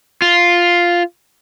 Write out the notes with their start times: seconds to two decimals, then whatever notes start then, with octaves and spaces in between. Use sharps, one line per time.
0.22 F4